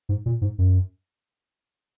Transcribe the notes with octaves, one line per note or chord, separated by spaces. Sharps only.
G#2
A#2
G#2
F#2